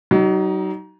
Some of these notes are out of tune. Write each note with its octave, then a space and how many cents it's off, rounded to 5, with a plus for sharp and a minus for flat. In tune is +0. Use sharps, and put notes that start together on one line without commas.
F#3 +35 D#4 +0